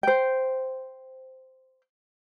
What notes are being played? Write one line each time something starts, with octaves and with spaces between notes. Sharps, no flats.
C5 G5